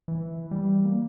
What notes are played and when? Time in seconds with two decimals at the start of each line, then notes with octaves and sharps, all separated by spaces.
0.08 E3
0.51 G3
0.85 A#3